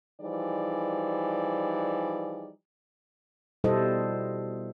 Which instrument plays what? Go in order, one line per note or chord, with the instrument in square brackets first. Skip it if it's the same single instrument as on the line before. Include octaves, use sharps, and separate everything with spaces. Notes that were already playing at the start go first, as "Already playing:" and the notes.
[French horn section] E3 F3 G3 D#4 G#4 D5
[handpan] B2 G3 E4 A4 C5 D#5